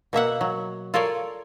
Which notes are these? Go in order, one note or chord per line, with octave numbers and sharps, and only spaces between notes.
B2 A#3 E5 F#5
F#3
F4 A4 A#4 C#5 D5